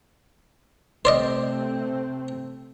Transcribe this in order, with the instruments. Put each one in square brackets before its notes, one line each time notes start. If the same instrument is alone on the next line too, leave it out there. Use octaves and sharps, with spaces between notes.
[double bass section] C3 A3 C4 [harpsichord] C5 D5 D#5